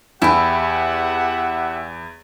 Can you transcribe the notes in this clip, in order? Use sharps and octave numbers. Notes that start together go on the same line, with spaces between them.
E2 E4 G4 E5 F#5 G5